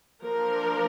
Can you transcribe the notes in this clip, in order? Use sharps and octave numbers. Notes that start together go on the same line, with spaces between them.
F3 A#3 D4 A#4